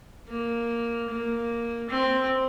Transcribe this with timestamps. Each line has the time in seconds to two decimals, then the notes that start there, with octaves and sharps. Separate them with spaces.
0.29 A#3
1.09 A#3
1.89 C4